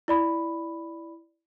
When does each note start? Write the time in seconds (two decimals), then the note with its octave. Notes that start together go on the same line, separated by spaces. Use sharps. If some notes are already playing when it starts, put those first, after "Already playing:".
0.08 E4 D5 B5